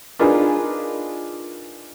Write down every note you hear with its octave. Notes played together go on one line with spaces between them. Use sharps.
D4 D#4 F4 G#4 A#4 B4